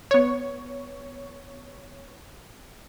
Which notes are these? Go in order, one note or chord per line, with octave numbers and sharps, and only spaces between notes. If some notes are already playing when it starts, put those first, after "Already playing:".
B3 C#5